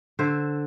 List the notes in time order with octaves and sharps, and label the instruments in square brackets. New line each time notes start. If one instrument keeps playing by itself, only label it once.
[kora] D3 C5 E5